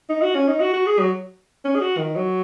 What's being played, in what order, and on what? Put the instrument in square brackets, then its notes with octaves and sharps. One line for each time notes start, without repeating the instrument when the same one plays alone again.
[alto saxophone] D#4
F#4
C#4
D#4
F#4
F#4
G#4
F#3
C#4
G#4
F#4
D#3
F#3